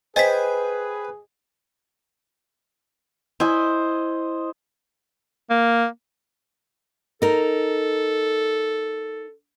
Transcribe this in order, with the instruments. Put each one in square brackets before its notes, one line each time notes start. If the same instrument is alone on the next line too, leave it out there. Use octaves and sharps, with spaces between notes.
[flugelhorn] G#4 [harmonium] B4 [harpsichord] C5 G5 G#5 [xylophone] D#5 B6
[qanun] E4 [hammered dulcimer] C5 D#5 G#5
[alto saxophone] A#3
[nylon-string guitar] D#4 A#4 [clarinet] A4